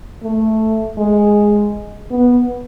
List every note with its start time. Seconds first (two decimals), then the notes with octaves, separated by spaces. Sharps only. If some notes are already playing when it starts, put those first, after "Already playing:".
0.23 A3
0.98 G#3
2.11 B3